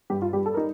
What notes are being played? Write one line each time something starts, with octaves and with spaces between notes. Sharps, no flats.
G2 G4
F4
G3 G4
A4
D#4 A#4